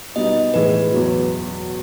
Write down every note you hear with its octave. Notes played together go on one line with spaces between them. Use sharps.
B2 G3 B3 D#4 D#5
A2 E3 G#3 B4
E2 B2 F#3